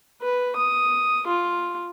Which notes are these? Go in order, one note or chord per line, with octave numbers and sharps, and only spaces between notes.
B4
D#6
F4